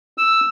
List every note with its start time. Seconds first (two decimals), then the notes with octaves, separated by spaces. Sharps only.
0.18 E6